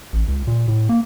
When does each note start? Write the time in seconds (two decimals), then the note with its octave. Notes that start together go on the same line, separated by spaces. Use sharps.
0.13 A1
0.28 C#2
0.47 A#2
0.68 A2
0.89 A#3